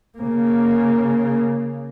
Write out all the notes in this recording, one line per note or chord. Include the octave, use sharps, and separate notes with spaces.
C#3 A#3